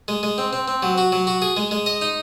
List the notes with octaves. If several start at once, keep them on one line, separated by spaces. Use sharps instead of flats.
G#3
G#3
C4
C4
C4
F#3
F#4
F#3
F#4
G#4
G#3
G#3
D#5
D#4